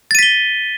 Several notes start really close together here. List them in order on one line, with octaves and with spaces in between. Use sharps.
A6 D#7 B6 G7